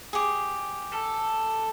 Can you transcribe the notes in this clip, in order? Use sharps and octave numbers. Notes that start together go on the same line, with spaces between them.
G4 G#4
A4